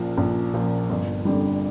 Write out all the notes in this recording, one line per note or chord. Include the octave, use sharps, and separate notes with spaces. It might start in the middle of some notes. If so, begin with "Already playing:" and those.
Already playing: A#1 A#2 F3 A#3
A#1
A#2 F3
G1
F2 D3 G3